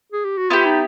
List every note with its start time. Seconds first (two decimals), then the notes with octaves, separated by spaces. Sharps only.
0.12 G#4
0.25 G4
0.38 F#4
0.50 B3 E4 F4 G4
0.65 D#4